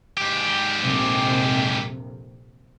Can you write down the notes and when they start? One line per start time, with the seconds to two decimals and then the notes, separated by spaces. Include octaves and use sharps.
0.17 G#2 G4
0.81 A#1 F2 C3